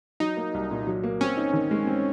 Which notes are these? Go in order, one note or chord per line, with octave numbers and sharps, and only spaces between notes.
F#3 D#4
A#3
C2
A#2
F#3
A#3
C4 C#4
D#4
D#3
G#3
C4